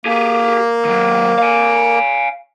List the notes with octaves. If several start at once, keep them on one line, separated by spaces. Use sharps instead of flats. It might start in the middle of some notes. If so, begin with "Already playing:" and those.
A#3 G4 G#4
D#3 F#3
F5 G#5